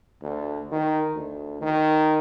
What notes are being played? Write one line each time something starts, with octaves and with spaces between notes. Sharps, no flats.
D2
D#3
D2
D#3